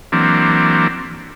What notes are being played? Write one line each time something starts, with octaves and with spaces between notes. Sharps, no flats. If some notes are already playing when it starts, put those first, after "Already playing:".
E3 F#3 A#3 C4 D4